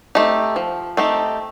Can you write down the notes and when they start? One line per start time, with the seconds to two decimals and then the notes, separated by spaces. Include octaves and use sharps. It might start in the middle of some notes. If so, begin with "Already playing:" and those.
0.15 A3 C4 D#4 G4
0.56 F3
0.97 A3 C4 D#4 G4